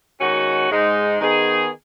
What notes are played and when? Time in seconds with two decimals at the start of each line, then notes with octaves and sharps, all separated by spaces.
0.20 D#3 G#3 C#4 F#4
0.70 G#2 G#3 D#4
1.20 D#3 B3 D#4 G#4